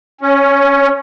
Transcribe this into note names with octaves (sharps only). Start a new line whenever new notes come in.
C#4